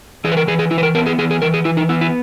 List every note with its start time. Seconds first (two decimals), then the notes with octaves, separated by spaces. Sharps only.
0.24 E3 G#4
0.32 B4
0.37 A#4
0.47 E3 G#4
0.59 G#4
0.71 E3 E4
0.78 B4
0.83 A#4
0.95 B3 A#4
1.06 G#4
1.18 E3 G#4
1.31 G#4
1.42 E3 A#4
1.54 G#4
1.65 E3 E4
1.77 D#4
1.89 B3 E4
2.01 E4